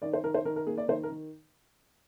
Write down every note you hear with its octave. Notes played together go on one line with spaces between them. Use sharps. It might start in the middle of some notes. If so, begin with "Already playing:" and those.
D#3 D5
C5
D#3 A#4
C5
D#3 A#4
A#4
A#3 G#4
D5
D#3 C5
A#4
D#3